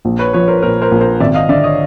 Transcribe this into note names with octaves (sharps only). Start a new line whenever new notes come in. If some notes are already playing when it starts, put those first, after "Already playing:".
A#1
B4 C#5
F3 B4 C#5
A#4 C5
A#2 A#4 C5
A#4 C5
A#1
A#4 C5
G#1 D5 E5
D#5 F5
D3 D5 E5
C#5 D#5